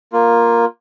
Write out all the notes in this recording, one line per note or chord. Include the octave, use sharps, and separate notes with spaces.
A#3 F4